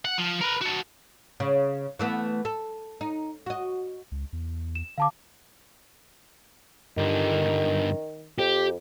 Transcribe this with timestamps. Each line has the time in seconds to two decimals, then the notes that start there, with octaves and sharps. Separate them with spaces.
0.05 F#5
0.18 F3
0.42 A#4 B4
0.62 F#4 A4
1.40 C#3
1.99 E3 A3 B3
2.45 A4
3.01 D#4
3.46 F#4 D#5
4.12 C#2
4.33 E2
4.75 E7
4.98 D3 F5 A5 D6
6.97 G2 D3 D#3
8.38 F2 G4